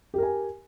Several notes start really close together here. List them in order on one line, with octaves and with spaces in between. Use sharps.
G4 A#4 G#5